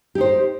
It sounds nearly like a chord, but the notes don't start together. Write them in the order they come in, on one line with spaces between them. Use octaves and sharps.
G4 D#4 C5